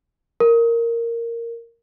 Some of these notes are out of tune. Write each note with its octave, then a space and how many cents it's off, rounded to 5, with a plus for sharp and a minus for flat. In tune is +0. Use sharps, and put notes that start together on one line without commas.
A#4 -10